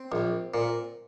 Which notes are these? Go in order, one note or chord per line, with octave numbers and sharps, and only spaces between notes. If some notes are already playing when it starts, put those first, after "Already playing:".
Already playing: C4
A#1
A#2